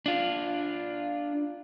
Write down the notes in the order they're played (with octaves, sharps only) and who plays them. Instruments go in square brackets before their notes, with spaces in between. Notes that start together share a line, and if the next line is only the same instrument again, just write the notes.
[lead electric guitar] D4 F4